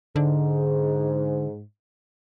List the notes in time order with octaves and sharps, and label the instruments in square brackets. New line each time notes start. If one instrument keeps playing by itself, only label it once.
[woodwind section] G#2 [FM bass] D3